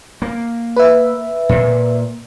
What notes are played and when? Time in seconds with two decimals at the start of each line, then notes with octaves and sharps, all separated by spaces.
0.22 A#3
0.76 B4 E5
1.49 A#2